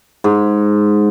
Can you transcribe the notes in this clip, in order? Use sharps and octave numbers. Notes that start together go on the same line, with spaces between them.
G#2